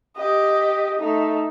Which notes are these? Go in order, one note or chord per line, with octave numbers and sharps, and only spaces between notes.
G4 D#5
A3 D#4